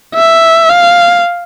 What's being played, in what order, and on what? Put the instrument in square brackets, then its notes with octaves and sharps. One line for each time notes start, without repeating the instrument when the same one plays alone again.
[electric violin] E5
F5